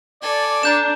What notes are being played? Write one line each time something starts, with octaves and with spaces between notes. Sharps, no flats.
A4 D5 G#5
D4 A#5 G6 E7